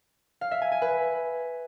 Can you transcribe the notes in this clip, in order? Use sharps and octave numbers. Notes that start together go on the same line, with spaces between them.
F5
E5
G#5
G#5
B4